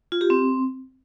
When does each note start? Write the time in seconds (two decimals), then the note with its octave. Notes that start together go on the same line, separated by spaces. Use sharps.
0.12 F4
0.21 G4
0.30 C4